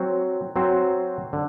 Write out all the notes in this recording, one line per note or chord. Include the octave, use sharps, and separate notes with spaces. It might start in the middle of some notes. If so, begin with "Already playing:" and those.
Already playing: F#3 C4 F#4 C5
F#3 C4 F#4 C5
D3